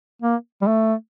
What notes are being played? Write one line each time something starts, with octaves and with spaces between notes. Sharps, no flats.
A#3
G3
A3